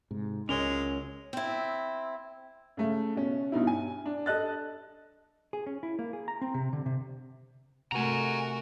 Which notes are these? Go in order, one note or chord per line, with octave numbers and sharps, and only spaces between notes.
G#2 C3
C#2 G#3 C#4 A#4 C#5 F7 G7
C4 E4
C#3 A3
B2 C#4
G2 B2 D#4 E4
G#5
D4
A4 D#5 F#6 A6
G#4
C#4
E4
A#3
G#4
A#5
C4
C3
D3
C3
C3 A3 F#4 A#4 G#5 A#5